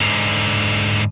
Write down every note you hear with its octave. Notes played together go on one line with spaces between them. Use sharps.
G#2 D3